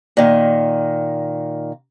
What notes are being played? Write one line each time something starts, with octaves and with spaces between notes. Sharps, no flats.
A#2 D#3